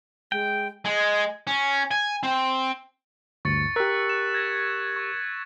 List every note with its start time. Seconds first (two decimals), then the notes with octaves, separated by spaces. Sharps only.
0.32 G#3 G5
0.85 G#3
1.47 C#4
1.91 G#5
2.23 C4
3.45 D2 G2 C#6 A6 C#7
3.76 G4 A#4 E6 F#6 B6
4.09 E7
4.34 G#6 A#6
4.96 C#6